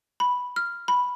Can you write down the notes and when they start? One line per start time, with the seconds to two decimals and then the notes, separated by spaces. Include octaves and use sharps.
0.20 B5
0.56 F6
0.88 B5